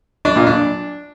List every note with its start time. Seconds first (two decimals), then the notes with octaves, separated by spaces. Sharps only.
0.25 D4
0.36 A#2
0.47 D4